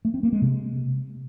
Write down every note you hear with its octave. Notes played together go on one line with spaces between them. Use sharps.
A3
C4
A#3
G#3
C3